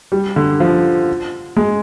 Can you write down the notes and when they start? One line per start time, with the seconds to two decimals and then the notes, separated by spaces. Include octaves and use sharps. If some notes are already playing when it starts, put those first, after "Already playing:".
0.12 G3
0.36 D3
0.60 F3
1.56 G#3